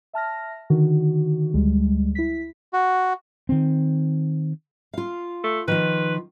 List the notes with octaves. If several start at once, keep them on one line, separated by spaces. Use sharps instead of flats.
E5 A5 F6 A#6
D3 D#3 F#4
D2 G3 G#3
E4 B6
F#4
D#3 C4
F4 F5
A3
D#3 F3 F4 B4